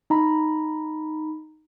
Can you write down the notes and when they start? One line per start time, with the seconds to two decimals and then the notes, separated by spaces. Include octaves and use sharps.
0.10 D#4 A#5 B5